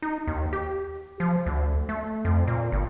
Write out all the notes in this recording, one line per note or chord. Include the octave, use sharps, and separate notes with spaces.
D#4
D#2
G4
F3
D2
A3
F2
A#2
G1